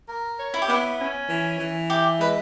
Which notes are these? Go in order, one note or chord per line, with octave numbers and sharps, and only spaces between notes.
A#4
C#5
E4
G4
B3 E4
C#4
E3
E3
E4 G4
G#3 B4